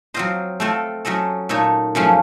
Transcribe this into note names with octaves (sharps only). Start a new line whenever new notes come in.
F#3 C4 F4 C5 D#5
A3 C4 F4 A4
F#3 A3 C#4 A4 D#5
A#2 A3 D#4 A4 C#5
F#2 C#3 F3 A3 C#4